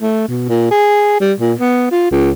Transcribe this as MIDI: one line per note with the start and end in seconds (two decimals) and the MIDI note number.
0.01 0.26 57
0.28 0.49 47
0.49 0.68 46
0.71 1.15 68
1.20 1.33 55
1.40 1.53 46
1.59 1.89 59
1.91 2.07 65
2.11 2.31 37